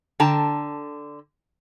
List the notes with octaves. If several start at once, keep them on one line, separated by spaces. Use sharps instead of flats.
D3 G5 A5 A#5